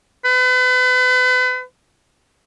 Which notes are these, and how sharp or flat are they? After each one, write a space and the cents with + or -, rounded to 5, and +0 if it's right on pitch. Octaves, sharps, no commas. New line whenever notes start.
B4 +35